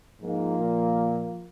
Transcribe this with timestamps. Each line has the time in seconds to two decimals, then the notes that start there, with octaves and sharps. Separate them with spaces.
0.21 G#2 F3 A#3 F4 A#4
0.58 A#2